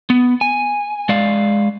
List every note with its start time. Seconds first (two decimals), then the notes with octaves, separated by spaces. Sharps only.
0.10 B3
0.41 G#5
1.09 G#3 D5 F5